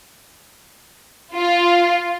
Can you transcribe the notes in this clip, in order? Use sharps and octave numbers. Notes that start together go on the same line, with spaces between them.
F4